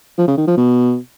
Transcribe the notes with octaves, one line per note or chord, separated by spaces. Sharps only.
F3
C#3
D#3
F3
B2